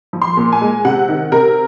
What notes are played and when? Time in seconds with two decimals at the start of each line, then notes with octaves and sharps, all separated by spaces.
0.13 F3
0.22 C6
0.37 A#2
0.52 G#5
0.61 G#3
0.85 C3 F#5
1.09 D#3
1.32 C3 A#4